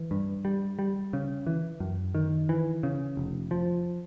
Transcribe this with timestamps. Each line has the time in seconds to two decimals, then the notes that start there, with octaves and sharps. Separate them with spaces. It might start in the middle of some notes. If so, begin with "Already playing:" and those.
Already playing: E3
0.11 G2
0.45 G3
0.79 G3
1.13 C#3
1.47 E3
1.80 F#2
2.15 D#3
2.49 E3
2.83 C#3
3.17 F1
3.51 F3